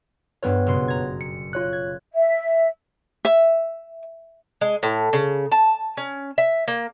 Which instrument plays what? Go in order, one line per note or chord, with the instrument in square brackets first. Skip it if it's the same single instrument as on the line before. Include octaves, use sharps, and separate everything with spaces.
[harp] G2 G3 F4 [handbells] B3 B4 C#5
[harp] F#1 B2 C6
A#5 G#6
[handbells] C#7
F4 C#5 F#6
[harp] G#6
[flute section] E5
[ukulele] E5
[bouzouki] G#3
A2
C#3
A5
C#4
E5
A#3